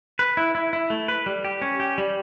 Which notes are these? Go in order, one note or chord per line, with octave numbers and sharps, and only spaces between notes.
B4
E4
E4
E4
A3
B4
G3
G4
C#4
G4
G3